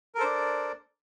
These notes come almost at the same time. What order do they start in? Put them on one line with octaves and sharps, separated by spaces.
A#4 A4 C5 D4 D5